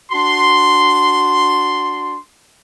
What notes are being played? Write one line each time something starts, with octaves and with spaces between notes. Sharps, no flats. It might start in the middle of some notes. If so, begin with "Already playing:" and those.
D4 F#4 C6